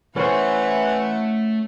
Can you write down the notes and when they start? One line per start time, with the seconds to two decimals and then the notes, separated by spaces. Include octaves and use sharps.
0.16 E3 A3 C#4 E4 C5 F#5